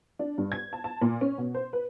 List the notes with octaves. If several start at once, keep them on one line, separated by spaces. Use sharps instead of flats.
D4
G2
G#6
A5
A5
A#2
C#4
B2
C5
B4